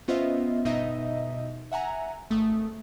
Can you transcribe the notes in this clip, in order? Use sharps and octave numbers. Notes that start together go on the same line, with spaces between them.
B3 C#4 F4 C5 D#5 E5
G1 B2 D#4 D#5 E5
E5 F#5 G#5 A#5
G#1 A3 D#6